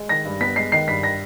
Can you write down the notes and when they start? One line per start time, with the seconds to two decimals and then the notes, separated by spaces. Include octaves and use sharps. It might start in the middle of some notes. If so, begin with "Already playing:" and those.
Already playing: G#3
0.09 D#3 A#6
0.25 G2
0.41 B3 B6
0.56 G#3 C7
0.72 D#3 C7
0.87 G2 B6
1.03 A#6